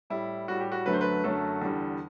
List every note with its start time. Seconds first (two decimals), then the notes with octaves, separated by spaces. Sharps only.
0.10 A2 G3 E4
0.48 A2 G3 F#4
0.60 G4
0.72 F#4
0.86 F#2 D3 F#3 A3 B4
0.93 C5
1.01 B4
1.24 F#2 D3 F#3 A3 A4
1.62 E2 D3 G3